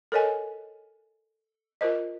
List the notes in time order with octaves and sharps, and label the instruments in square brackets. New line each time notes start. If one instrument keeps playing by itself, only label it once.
[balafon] A4 A#4 C#5 D#5 G#5
F4 A#4 C5 D#5